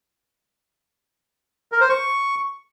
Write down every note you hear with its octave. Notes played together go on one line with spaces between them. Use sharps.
A#4
C5
C#6